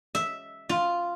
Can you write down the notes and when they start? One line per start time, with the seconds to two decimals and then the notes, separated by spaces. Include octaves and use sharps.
0.15 E5
0.69 F4